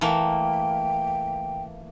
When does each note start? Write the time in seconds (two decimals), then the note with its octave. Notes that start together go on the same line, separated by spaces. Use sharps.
0.01 E3 A3 A#3 G5